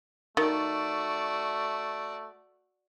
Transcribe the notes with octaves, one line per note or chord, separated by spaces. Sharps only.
D#3 A3 F#4 D5